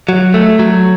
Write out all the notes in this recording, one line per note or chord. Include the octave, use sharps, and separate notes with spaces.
F#3
A3
F#3